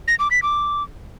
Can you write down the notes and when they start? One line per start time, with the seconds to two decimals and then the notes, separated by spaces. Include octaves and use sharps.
0.08 A#6
0.19 D6
0.31 B6
0.42 D6